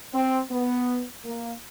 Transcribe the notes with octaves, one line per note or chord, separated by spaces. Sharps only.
C4
B3
A#3